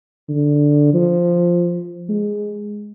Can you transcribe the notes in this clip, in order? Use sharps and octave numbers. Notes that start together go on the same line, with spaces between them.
D3
F3
G#3